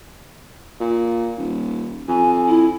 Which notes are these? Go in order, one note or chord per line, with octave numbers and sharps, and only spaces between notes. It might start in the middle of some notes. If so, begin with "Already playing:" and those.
A#2
D#1
F2 G#5
E4